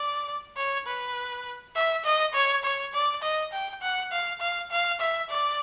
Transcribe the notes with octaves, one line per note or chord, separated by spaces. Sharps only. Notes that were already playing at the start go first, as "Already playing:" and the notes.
Already playing: D5
C#5
B4
E5
D#5
C#5
C#5
D5
D#5
G5
F#5
F5
F5
F5
E5
D5